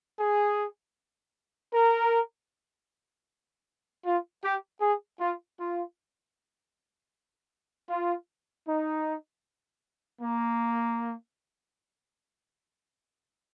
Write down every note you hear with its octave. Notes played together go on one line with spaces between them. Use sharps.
G#4
A#4
F4
G4
G#4
F4
F4
F4
D#4
A#3